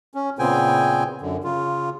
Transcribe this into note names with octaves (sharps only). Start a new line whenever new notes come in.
C#4
A#2 C#3 B3 C4 G5 G#5
F#2 D3
C#3 F4